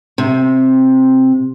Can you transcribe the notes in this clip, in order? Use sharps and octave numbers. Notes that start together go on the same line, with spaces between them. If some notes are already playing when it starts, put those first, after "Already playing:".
C3